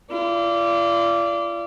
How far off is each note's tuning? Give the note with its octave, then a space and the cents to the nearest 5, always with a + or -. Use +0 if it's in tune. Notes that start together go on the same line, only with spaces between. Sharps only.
F4 -40 D5 -15